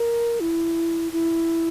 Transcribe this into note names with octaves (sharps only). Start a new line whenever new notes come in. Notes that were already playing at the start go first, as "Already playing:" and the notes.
Already playing: A#4
E4
E4